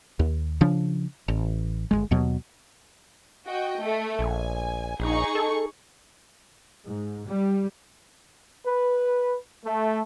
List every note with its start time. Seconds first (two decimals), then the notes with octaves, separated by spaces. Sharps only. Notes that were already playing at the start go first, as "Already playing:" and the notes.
0.19 D#2
0.61 C#3 F3 D4
1.28 A1
1.91 G1 C2 G#3
2.11 D#2 B2 F#3
3.46 F#4 D#5 G5
3.82 A3
4.19 A#1 G#5
5.00 A#1 D#4 G#4 C#6
5.35 A4
6.87 G#2
7.27 G3
8.66 B4
9.65 A3